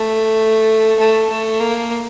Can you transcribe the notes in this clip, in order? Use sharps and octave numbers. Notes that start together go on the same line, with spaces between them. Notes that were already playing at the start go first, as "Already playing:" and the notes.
Already playing: A3
A3
A3
A#3